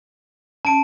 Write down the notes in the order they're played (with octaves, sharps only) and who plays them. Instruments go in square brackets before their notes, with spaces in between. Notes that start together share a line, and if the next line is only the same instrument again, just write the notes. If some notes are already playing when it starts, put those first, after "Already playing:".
[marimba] C#4 [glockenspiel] A5 D7